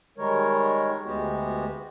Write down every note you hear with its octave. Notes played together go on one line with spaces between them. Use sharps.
D#3 G3 G#3 A#4 C#5
D2 G#3 B3 F#4 G4